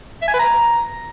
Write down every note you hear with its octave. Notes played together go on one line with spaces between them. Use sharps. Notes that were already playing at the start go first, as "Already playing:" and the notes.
E5
G#5
B4
A#5